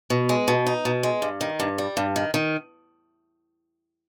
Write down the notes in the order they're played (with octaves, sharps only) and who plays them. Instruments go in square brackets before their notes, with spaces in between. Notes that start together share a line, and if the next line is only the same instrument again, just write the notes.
[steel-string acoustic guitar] B2
G#3
B2
D#4
B2
G#3
G2
D#3
G2
G3
G2
D#3
D#3